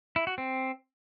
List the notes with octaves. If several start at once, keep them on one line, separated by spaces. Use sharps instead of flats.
E4
F#4
C4